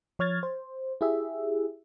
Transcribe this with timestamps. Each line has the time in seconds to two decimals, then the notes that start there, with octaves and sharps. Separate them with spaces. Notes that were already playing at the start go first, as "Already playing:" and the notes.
0.19 F3 C#5 F6 G#6 A6
0.43 C5
1.01 E4 G4 G#4 E5